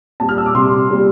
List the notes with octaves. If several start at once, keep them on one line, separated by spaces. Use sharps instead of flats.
A#2 G3 A5
F6
E6
D6
C3 G3 C6
A#2 G3